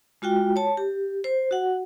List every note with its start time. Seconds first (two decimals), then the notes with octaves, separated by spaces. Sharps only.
0.22 G#3 F4 F#4 G5
0.56 C#5 A5
0.77 G4
1.24 C5
1.51 F#4 F#5